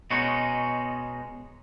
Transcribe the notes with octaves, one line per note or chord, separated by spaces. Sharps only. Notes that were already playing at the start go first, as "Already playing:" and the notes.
B2 G#3 C#4 D#4 F#4